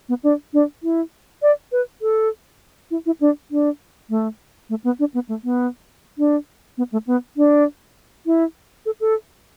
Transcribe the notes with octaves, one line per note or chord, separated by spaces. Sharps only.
B3
D4
D4
E4
D5
B4
A4
E4
E4
D4
D4
A3
A3
B3
D4
B3
A3
B3
D4
B3
A3
B3
D4
E4
A4
A4